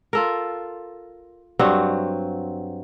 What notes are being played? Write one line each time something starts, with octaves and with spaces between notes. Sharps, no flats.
F4 A4 A#4
G2 F#3 C4 F#5